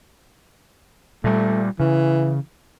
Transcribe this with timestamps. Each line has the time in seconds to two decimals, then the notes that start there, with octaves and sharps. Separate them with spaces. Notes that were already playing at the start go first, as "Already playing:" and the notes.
1.24 A#2 G3 A3
1.80 C#3 E3